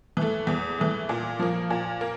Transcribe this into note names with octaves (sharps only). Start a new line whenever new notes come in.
E3 A3
E2
E3 A3
A#2
F3 A#3
A#2
A#3